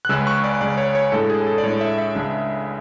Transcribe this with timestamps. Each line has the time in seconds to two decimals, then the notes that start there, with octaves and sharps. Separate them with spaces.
0.05 F#6
0.09 C#2 C#3 G#3 C#4 E6
0.27 C#6
0.44 D5
0.61 C#2 C#3 G#3 C#4 D5
0.77 C#5
0.95 C#5
1.12 A2 G#3 D4 A4
1.30 G#4
1.41 G#4
1.47 A4
1.58 D5
1.63 A2 G#3 D4 C#5
1.81 E5
1.98 E5
2.15 C#2 C#3 G#3 D4